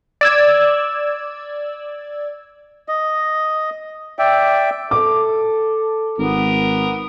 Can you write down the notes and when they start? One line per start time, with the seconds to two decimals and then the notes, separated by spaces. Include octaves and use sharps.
0.21 D5 E6 G#6
2.88 D#5
4.19 D5 E5 G5
4.91 A4 D6
6.18 G#1 B3 A#4